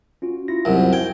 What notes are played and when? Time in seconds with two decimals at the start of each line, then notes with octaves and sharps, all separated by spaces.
0.22 C#4 F4 F#4
0.48 E4 F4 A#6
0.65 C2 F#2
0.93 D#4 G5 G#6